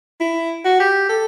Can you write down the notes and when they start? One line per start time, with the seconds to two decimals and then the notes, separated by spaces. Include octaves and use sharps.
0.21 E4
0.65 F#4
0.80 G4
1.09 A4